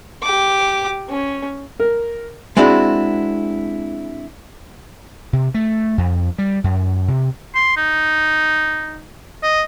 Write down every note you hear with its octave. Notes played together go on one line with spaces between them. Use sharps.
G4 D6
C#4
A#4
G#3 C4 D4 E4 F#4
C3
A3
F2
G3
F#2
C3
C6
D#4
D#5